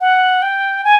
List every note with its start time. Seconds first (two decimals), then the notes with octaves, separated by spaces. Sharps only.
0.01 F#5
0.42 G5
0.84 G#5